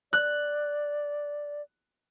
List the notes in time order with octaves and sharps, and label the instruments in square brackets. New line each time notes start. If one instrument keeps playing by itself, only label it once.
[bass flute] D5 [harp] F#6